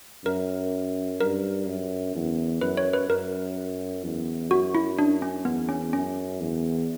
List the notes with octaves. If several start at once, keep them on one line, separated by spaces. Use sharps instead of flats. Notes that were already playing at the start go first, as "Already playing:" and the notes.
F#2 A#4
G2 A#4
F#2
E2
F#2 B4
C#5
B4
F#2 A#4
E2
F#2 F#4
E4
D4
C#4
E2 B3
C#4
F#2 C#4
E2